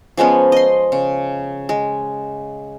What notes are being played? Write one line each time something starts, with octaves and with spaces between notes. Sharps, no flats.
F3 G#3 B3 C#4
D#5 C6
C#3
G#3